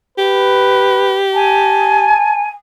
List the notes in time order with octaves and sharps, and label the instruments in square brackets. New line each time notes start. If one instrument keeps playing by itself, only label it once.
[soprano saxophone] G4 [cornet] B4
[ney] G#5 [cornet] A5